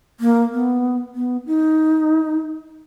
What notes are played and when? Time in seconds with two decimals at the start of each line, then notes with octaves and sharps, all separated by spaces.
0.20 A#3
0.52 B3
1.15 B3
1.47 D#4